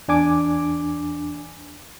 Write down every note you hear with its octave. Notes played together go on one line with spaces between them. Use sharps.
E2 D4 G#5 D6